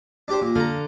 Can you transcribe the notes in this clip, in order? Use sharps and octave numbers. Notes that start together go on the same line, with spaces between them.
D4 G4 C5
A#2
D3 F5 A#5